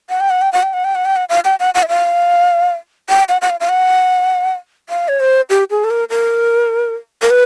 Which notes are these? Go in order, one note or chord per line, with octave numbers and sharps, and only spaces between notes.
F#5
G5
F#5
G5
F#5
G5
F#5
G5
F#5
G5
F#5
F5
G5
F#5
F#5
E5
F5
G5
F#5
F#5
F5
F5
F#5
F5
C#5
C5
G4
G#4
A4
A#4
A#4
A#4
B4